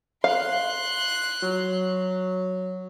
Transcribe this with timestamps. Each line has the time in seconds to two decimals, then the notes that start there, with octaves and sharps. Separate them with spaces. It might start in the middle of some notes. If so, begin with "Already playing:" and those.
0.24 F5 C6 F#6
1.42 F#3